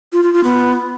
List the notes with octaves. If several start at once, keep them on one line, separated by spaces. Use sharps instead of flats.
F4
F4
F4
B3